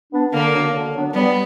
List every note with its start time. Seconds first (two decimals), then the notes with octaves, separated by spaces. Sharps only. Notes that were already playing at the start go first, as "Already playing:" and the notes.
0.13 B3 D4
0.34 D3 A#3
0.53 F#3 B3 D4
0.74 D3
0.95 F#3 B3 D4
1.14 G3 B3